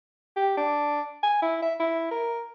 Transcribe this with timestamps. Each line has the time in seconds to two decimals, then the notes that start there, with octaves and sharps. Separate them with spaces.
0.36 G4
0.57 D4
1.23 G#5
1.42 E4
1.62 E5
1.80 E4
2.11 A#4